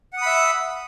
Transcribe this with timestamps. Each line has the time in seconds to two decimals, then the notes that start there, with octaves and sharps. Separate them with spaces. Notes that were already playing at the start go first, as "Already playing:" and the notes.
0.13 F#5
0.17 D#6
0.22 B5
0.26 E5